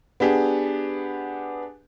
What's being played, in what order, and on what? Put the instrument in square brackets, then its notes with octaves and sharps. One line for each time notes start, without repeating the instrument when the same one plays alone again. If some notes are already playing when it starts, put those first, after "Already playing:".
[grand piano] B3 D4 G4 G#4